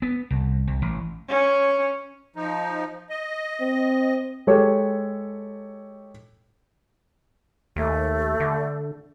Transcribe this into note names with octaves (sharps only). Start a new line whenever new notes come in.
B3
C2
C2
A1
C#4
F3 D#4
D#5
C4
G#3 G4 A4 C#5
D#2 A3
D3